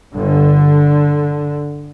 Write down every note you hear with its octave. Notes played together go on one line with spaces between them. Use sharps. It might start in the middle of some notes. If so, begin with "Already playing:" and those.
G1 G2 D3